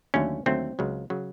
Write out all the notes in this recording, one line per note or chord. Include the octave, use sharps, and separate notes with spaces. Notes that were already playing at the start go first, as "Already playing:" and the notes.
D#2 D3 F#3 A3 C#4
D#2 D3 F#3 A3 C4
C#2 C#3 F#3
C#3 F#3